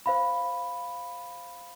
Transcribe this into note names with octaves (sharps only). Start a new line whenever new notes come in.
C5 F5 B5